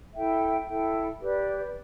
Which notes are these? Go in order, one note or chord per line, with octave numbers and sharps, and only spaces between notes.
E4 A4 E5 G5
E4 A4 E5 G5
G4 B4 D5